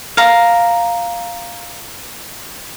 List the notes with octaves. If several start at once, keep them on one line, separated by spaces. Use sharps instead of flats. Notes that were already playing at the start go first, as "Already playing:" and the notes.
F5 A#5